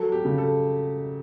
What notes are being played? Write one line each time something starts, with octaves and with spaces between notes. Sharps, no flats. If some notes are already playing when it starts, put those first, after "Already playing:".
Already playing: F#3 A4
G4
C#3
A4